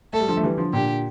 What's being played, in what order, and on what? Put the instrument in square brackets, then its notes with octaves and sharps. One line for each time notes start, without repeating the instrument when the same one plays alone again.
[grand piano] A3 [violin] A4
[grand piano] G3
D3 F3
A3
E3 G3
D3 F3
[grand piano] A#2 D3 [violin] G4